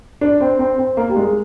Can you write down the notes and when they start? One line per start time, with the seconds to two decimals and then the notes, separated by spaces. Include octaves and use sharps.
0.21 D4
0.41 C4
0.59 C4
0.78 C4
0.97 A#3
1.09 G3
1.16 G#3